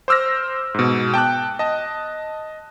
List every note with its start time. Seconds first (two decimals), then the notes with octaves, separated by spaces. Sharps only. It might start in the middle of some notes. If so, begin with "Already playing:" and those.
0.08 C5 D6 E6 F6 A#6
0.74 G#2 B2
1.14 G5 A5 D6 F#6
1.59 D#5 A5